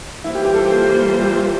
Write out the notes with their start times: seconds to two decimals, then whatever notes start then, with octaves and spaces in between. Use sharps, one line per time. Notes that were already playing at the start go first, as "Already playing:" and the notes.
0.24 E3 G3 A#3 E4 F4 C5
0.35 G4
0.45 G4
0.54 A4
0.65 G4